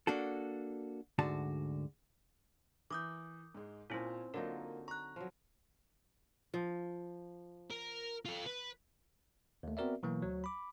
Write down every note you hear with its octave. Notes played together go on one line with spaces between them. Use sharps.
A#3 D4 F#4 A4
D2 G#2 D3 F#4 A5
E3 A#4 D6 D#6 G6
G#2 G#3
A#2 C4 C#4 E4 F4
D3 F#3 A#3 D#4 F4 A#4
A#5 C#6 F#6
F3 F#3
F3
A#4
F4 A4
B4
D#2 A3
B3 C4 F#4 A#4 D5 E5
B2 E3 F#3 A#3
D2 F#3
B5 D6